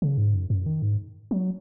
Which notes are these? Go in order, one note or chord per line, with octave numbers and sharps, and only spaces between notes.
C#3
G#2
F#2
F#2
D#3
G#2
F#3